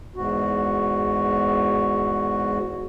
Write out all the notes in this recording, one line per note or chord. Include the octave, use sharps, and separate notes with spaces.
E2 G#2 F#4